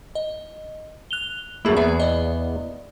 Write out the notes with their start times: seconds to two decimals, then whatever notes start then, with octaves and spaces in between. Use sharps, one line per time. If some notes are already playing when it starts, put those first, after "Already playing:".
0.15 D#5
1.11 F#6 F7 G7
1.65 F#2 A3 A#3 E4 G#4
1.77 E2 B3 G#4 E5
2.00 D5 D#5